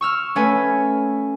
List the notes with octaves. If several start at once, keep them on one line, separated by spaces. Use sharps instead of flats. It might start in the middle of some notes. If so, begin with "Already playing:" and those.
C#6 E6 F6
A3 C#4 B4 G#5